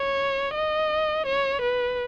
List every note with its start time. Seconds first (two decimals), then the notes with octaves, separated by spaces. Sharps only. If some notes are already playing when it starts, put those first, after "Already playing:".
Already playing: C#5
0.55 D#5
1.27 C#5
1.62 B4